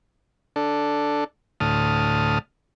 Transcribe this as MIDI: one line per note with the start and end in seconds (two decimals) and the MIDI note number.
0.56 1.24 62
0.56 1.24 69
1.60 2.39 38
1.60 2.39 45
1.60 2.39 81
1.60 2.39 87
1.60 2.39 89